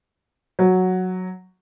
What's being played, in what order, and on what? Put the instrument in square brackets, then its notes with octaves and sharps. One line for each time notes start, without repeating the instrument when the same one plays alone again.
[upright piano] F#3